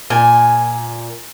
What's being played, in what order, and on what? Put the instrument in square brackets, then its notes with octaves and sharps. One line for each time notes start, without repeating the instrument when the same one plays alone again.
[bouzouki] A#2 G#5